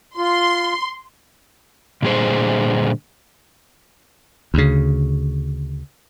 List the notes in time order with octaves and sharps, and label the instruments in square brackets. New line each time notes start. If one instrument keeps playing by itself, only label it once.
[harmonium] F4 [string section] C6
[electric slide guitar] A#2 D3 G3 F4 G#4 C5
[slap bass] D2 C#3